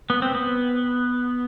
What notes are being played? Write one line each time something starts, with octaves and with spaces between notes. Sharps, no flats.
B3
C4
B3